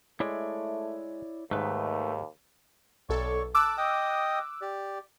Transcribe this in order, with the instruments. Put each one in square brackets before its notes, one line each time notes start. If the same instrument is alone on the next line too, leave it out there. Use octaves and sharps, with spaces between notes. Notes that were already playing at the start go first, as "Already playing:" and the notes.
[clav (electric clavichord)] G#3 [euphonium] A3 [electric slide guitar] E4 C#5 D5
[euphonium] D#2 [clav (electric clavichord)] G#2 D#3 [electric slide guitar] A3 B4
[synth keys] B1 A4 [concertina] C#5 D5 C#6
[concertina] A5 [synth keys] D6 E6 F#6
[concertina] D#5 G5 D#6
G4 D5